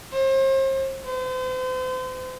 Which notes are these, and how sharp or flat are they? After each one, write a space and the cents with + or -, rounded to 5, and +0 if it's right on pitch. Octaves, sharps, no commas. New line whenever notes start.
C5 +40
C5 -40